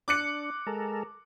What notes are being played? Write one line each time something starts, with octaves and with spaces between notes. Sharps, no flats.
D4 D6 F#6 C#7
G#3 A4 A#4